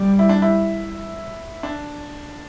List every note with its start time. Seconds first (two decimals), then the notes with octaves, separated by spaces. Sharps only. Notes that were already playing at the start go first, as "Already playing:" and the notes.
Already playing: G3
0.19 E4
0.29 D4
0.42 E4
1.63 D4